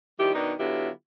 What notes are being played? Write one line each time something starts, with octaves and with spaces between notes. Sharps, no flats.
D#3 F3 G3 E4 G4
B2 D#3 D4 D#4
D3 F#3 B3 E4 F4 G4